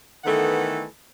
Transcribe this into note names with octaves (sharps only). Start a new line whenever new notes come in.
D#3 E3 A3 B3 A4 F#5